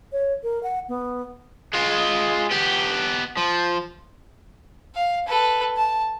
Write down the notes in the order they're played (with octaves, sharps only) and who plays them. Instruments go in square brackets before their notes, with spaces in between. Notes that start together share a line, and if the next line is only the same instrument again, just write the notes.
[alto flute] C#5
A#4
F#5
B3
[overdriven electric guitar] G#3 F4
B3 G4
F3
[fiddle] F5
A4 B4
A5